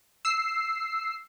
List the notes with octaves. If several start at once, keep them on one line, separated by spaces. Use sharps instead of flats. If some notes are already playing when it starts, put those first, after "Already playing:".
E6 C7